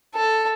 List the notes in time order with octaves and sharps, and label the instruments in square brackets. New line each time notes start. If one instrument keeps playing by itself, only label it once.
[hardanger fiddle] A4